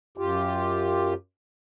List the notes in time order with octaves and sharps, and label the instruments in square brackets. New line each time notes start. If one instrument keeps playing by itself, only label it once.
[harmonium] F#2 F4 G4